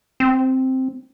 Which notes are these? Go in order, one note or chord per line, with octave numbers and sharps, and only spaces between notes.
C4